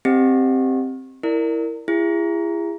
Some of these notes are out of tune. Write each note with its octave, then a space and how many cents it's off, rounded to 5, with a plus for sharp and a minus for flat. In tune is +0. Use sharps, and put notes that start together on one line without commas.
C4 +5 G4 +0 D#5 +0
E4 +0 A#4 -10 D5 +0
E4 +35 G#4 -30